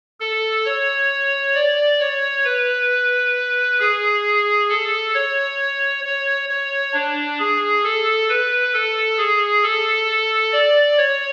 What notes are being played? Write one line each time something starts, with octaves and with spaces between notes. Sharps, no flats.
A4
C#5
D5
C#5
B4
G#4
A4
C#5
C#5
C#5
D4
G#4
A4
B4
A4
G#4
A4
D5
C#5